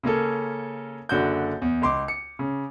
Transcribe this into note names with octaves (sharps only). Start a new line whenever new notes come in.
C#3 A#3 C#4 A4
F#1 D3 F#4 G6
E2
C#2 C6 D6
C#7
C#3